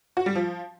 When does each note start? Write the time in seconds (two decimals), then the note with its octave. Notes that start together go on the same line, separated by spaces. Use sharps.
0.17 F#4
0.26 G3
0.35 F3